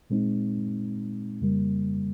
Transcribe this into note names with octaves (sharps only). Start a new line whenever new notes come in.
A#2 G#3 C4 D#4
F2 C#3 G3 A#3